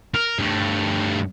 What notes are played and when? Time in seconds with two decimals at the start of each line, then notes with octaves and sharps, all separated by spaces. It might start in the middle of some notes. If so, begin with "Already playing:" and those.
0.14 A#4
0.39 G2 A3